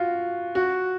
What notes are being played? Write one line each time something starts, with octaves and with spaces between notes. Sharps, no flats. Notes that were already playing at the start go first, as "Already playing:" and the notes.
Already playing: F4 F#4
F#4